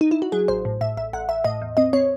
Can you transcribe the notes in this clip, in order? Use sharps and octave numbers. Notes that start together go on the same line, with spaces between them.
D#4
E4
F#4
F#3 G#4
A1 C5
A2
A2 E5
A1 E5
A1 F#5
A1 E5
A2 D#5
E2
C4 D#5
C4 C#5